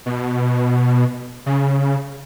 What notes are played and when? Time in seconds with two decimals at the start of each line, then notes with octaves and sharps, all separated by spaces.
0.06 B2
1.46 C#3